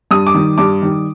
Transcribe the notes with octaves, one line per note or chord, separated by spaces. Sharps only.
G2 D#6
D6
D#3 G3
G2 D6
D#3 G3